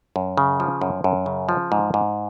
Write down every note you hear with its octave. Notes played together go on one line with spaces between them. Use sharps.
F#2
C#3
F3
F#2
F#2
C#3
F3
G#2
G#2